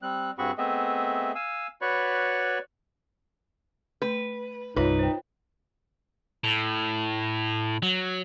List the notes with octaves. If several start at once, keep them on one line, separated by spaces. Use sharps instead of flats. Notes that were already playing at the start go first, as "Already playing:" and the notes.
G3 C4 F#6
G2 C4 F#4 G#4 B5 C#6
A3 B3 C4 G#4 D#5 E5
F5 G#5 E6
F#4 B4 C#5 D5 B5 C#6
A3 B4
C2 G2 D#4 F4 B4 C#5 E5
C5 G5
A2
F#3